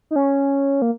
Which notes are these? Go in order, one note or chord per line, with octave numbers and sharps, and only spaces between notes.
D#4
C#4
A#3